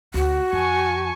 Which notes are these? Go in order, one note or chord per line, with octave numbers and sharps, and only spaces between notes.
D2 F#4
F2 G#5 A5 C#6